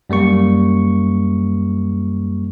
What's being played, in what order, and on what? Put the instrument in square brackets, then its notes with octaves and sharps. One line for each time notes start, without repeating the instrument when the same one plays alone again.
[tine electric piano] F#2 G3 A#3 C#6